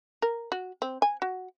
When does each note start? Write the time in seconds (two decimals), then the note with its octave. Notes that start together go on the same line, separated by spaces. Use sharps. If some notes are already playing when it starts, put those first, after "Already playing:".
0.22 A#4
0.52 F#4
0.82 C4
1.02 G#5
1.22 F#4